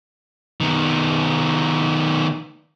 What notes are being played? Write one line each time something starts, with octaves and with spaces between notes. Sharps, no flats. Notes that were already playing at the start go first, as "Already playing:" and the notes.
D#3 B3